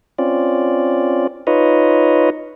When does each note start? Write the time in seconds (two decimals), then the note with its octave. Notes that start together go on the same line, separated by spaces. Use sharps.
0.19 C4 C#4 F4 D5
1.47 D#4 F4 B4 C#5 D#5